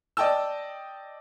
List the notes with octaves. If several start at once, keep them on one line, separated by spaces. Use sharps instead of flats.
D5 D#5 G5 A5 E6